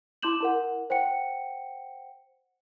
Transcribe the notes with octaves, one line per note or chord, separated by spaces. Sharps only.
E4 C6 D6 G6 E7 F#7
E4 A#4 F#5
C5 F#5 G5 C#7